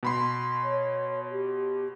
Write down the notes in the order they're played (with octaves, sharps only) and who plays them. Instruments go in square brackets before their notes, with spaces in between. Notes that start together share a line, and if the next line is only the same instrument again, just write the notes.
[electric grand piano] B2 B5 C6
[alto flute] C#5
G4